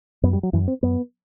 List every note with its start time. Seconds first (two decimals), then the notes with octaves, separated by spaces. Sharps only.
0.23 F#2 B3
0.33 G3
0.43 F#3
0.53 F#2 E3
0.68 C4
0.83 F#2 B3